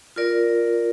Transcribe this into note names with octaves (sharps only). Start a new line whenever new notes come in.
F4 A#4 D5